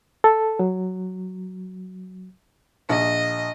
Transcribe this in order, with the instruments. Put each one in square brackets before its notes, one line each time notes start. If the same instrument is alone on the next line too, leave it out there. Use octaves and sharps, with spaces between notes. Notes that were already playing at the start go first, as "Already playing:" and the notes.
[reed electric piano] A4
F#3
[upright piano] A#1 [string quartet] D#5